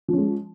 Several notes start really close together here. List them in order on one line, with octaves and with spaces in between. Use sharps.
F3 C#4 G#3